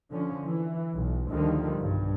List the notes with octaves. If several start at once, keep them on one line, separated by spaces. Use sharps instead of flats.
D3 F3 C#4
E3
B1
D2 D3 D#3 F3 G3
B1 G2